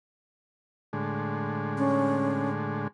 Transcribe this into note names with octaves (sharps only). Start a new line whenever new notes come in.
A2 D3 G#3
C#4